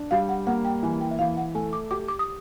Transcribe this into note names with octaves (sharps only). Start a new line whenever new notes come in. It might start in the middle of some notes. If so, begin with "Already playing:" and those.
Already playing: D4
G3 F5
F#5
A#3 F#5
G5
E3 G#5
G5
E5
E3 F5
F#5
A3 G#5
D6
G4 D6
D6
D#6